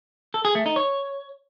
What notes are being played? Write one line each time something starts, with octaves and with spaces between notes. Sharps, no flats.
A4
G#4
A3
D#4
C#5